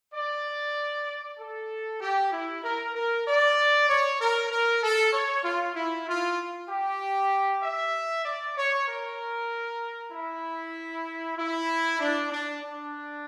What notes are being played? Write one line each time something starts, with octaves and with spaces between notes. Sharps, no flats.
D5
A4
G4
E4
A#4
A#4
D5
C#5
A#4
A#4
A4
C#5
F4
E4
F4
G4
E5
D5
C#5
A#4
E4
E4
D4
D4
D4